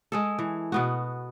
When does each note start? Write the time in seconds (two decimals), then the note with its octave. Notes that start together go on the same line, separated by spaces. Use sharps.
0.12 G#3 G#4 A4
0.39 E3
0.72 B2 B3 F#4